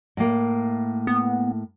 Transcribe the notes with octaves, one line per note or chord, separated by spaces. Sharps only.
A2 A#3
B3